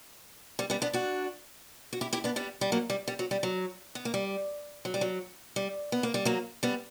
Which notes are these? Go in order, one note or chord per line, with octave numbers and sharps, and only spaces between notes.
G3
G3 B3
B3 D4
D4 F#4
F#4
E4 G4
E4 G4
B3 D4
G3 B3
G3
F#3 A#3
G3
G3
F#3
G3
F#3
B3
A#3
G3
F#3
G3
F#3
G3
B3
A#3
G3
F#3 A#3
G3 B3